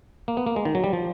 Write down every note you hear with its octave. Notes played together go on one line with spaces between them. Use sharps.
A#3
B3
A#3
G#3
D#3
F#3
G3
F3